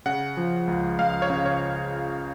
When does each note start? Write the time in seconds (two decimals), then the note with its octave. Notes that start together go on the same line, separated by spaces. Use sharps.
0.06 C#3 F#5
0.37 F3
0.67 C#2
0.99 C#2 F5
1.22 C#5
1.30 C#3
1.46 C#5